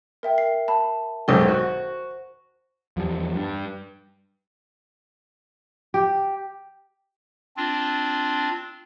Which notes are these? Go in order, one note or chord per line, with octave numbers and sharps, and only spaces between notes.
A#4 E5 G5
C7
A5 B5
B1 G#2 D#3 C5 G7
F#4
E2 F3 G3
G2
G4
C4 D4 F4